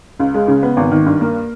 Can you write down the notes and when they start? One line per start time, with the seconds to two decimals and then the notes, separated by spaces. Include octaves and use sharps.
0.19 C#2
0.34 G#3
0.48 C#3
0.63 B3
0.77 G#1
0.91 D#3
1.06 G2
1.21 A#3